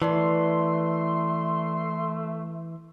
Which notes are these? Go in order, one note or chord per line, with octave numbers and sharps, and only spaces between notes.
E3 A3 B4 D5 A5 C6